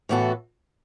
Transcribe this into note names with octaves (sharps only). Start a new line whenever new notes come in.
A2 E3 B3 F#4 A4